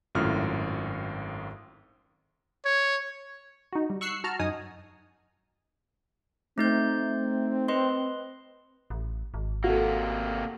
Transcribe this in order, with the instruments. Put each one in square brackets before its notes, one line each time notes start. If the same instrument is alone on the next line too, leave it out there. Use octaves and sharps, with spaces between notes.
[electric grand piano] G#1 F#2 A2 F4 F6
[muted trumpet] C#5
[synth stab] D#4 F#4
G3
C#6 E6 F#6 C7
F#4 A5 A#5 F6
F#2 D#4 G#5 D#6
[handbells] A3 D#4 G6 [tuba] C4
[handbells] B4 D#5 C6
[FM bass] A1
G#1
[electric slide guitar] C3 A#3 [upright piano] F#4 A4